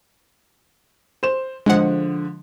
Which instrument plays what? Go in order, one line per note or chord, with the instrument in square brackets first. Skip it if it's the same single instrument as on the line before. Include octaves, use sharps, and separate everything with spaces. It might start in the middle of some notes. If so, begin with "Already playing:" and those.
[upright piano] C5 E7
[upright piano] D3 F3 [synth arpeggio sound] G#3 F#5